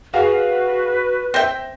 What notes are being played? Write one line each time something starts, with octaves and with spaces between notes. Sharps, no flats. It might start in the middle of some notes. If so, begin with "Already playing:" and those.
F#4 G#4 B4 F5 F#5
C4 E5 G5 A#6